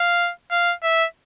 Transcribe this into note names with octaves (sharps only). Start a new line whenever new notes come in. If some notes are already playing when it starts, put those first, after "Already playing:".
Already playing: F5
F5
E5